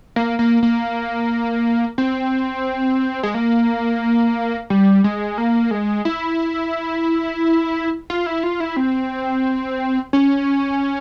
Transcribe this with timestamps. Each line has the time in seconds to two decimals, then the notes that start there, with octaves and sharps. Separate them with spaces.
0.16 A#3
0.39 A#3
0.63 A#3
1.98 C4
3.23 G#3
3.34 A#3
4.70 G3
5.04 G#3
5.38 A#3
5.71 G#3
6.05 E4
8.10 F4
8.26 E4
8.43 F4
8.60 E4
8.77 C4
10.13 C#4